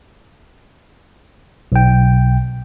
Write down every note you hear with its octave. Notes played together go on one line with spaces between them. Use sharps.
B1 G5